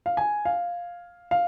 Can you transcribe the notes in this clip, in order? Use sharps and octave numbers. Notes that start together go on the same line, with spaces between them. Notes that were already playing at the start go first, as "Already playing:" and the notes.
F5
G#5
F5
F5